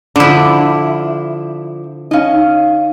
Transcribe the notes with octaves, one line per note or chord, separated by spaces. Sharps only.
D3 F3 D4 E4
C#4 D#4 D#5 F5